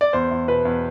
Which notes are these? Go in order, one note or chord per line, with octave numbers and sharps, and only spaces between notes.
D5
E2 C5
E2
B2 B4
E2